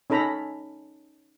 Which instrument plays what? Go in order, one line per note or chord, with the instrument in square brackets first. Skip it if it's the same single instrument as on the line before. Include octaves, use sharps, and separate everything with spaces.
[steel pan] C#4 D#4 A4 A#5 B5